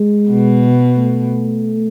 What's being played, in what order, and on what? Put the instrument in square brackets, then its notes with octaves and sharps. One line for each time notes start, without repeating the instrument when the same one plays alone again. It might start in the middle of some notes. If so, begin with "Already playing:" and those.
Already playing: [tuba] G#3
[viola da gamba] B2
[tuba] A3